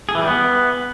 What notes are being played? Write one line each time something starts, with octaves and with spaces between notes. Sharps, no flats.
G#4
E3
G3
B3